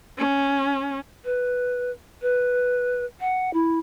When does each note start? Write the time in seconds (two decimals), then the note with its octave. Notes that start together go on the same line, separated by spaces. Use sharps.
0.18 C#4
1.25 B4
2.22 B4
3.20 F#5
3.54 E4